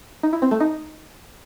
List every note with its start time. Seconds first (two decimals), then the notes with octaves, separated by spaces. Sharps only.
0.23 D#4
0.33 E4
0.42 C4
0.51 A3
0.60 D#4